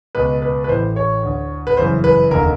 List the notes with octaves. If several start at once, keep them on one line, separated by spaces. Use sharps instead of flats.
C#2 B2 B4
B4
B4
A1 A2 E3 C5
C#5
D2 D3
B4
G1 F#2 C#3 E3 C5
B4
F1 D#2 D3 A#4